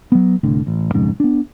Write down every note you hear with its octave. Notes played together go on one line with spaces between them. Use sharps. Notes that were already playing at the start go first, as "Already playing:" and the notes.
F#3 B3
C2 A2 D3
A1
B1 F2 G#2 C#3
B3 D4